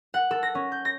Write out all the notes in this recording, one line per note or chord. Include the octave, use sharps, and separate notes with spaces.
F#5
A4
A#6
C#4
G6
A#6